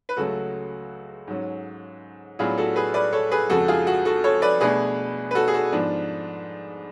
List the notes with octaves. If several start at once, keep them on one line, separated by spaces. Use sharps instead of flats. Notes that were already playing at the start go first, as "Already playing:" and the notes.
B4
C#2 C#3 F#3 A3 F#4 A4
G#2 F#3 C#4
A2 F#3 B3 D4 F4 G#4
F#4 A4
G#4 B4
B4 D5
A4 C#5
G#4 B4
F2 C#3 G#3 F#4 A4
F4 G#4
F#4
F#4 A4
A4 C#5
B4 D5
B2 A3 D4 G#4 B4
B4
F#4 A4
G#4
F#4 A4
G#2 F3 B3 D4